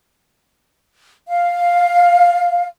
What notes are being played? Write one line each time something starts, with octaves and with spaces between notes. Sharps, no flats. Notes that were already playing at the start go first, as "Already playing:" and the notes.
F5